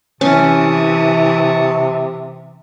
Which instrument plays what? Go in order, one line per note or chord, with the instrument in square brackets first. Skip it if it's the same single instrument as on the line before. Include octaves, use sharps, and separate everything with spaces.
[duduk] C3 [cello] E3 [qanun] C#4 [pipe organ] A5 C#6 D#6